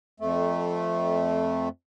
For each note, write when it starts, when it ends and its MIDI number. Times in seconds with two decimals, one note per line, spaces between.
0.20 1.69 41
0.20 1.69 57